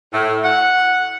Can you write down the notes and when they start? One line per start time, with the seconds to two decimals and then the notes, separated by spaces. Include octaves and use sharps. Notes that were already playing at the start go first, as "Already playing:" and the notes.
0.13 A2
0.43 F#5